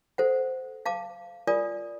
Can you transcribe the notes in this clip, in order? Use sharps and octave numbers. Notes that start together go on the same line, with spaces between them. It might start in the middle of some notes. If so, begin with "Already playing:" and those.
A4 C5 F#5
F5 A5 D6
F4 A#4 D5 G#5 D#6